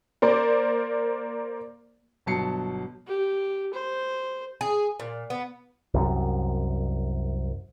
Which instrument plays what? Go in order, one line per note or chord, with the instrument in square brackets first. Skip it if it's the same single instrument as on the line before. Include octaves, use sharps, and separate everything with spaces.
[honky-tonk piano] A#3 A#4 C5 D5
[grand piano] G1 B2 F#3 A5 C7 C#7
[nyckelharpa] G4
C5
[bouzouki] G#4
A#2
B3
[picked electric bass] C2 F#2